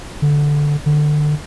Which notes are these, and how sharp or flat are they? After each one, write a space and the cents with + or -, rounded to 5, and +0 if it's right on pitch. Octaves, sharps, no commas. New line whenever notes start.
D3 -5
D3 +25